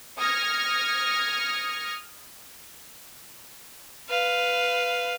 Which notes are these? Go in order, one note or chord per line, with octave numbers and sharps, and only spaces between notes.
D#6 F6 G#6 A#6 C#7
B4 F5